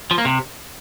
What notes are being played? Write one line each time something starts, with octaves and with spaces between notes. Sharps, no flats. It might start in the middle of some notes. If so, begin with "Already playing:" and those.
F3
A#3
C3